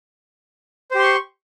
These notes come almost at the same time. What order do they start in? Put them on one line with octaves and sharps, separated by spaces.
C5 G4 C6 C#6